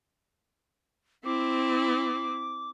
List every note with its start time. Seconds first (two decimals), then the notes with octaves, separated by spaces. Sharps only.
1.25 C4 E4 D6